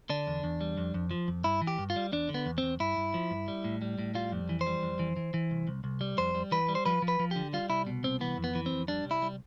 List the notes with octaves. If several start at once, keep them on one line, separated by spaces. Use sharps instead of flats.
D3 D4
E2
E2
G3
F2
F2
F3
F2
G2 E4
E3
G4
G2
F4
G3
E2 D4
D3
B3
E2
E2 C4
G2 E4
G2
F3
G2
G3
A2
G3
A2
G3 F4
F2
E3
C5
G3
F2
E3
E3
E3
C2
C2
C2
G3
F2 C5
G3
E3 B4
G3
C5
F3 B4
F3
B4
F3
D3 G4
G3 F4
C2 E4
B2
C2 C4
E3 B3
F2
B3
E3
C4
F2
G3 D4
C2
E4
G3